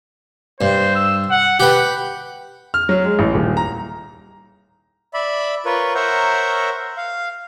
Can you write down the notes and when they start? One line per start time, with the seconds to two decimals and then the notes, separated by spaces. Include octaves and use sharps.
0.61 G2 C5
0.96 E6
1.31 F#5
1.60 G4 B4 F#5
2.74 F6
2.89 F#3
3.05 G#3
3.19 A1
3.34 D#1
3.57 A#5
5.14 D5 E5 B5
5.65 F4 A#4 B4 C#5
5.95 A#4 C5 C#5 E5 F#5 A#5
6.97 F5